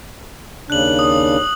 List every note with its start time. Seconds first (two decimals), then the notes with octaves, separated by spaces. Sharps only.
0.70 D#2 C#3 D4 F#6 F#7
0.99 D#6